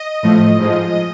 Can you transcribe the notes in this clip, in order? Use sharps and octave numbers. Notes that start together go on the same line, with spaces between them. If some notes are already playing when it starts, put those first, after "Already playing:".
Already playing: D#5
A2 F3 A3
G#2 F3 G#3